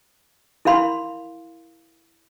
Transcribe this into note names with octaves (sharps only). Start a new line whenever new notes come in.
E4 A#4 F5 B5 C6